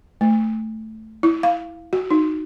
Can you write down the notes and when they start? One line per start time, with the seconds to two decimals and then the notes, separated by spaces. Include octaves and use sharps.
0.21 A3
1.23 E4
1.43 F5
1.93 F#4
2.11 D#4